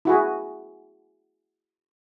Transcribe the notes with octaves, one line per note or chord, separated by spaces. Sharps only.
E4 F#4 G#4